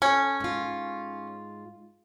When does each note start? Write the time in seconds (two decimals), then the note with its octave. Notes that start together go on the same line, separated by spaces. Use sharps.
0.02 C#4 A4 G#5
0.40 G#2 F4